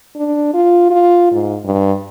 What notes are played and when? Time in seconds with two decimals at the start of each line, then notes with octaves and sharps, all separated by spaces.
0.16 D4
0.54 F4
0.91 F4
1.32 G#2
1.65 G2